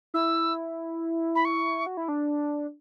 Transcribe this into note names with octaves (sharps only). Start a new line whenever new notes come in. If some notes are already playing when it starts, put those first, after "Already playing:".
E4 E6
B5
C#6
F#4
E4
D4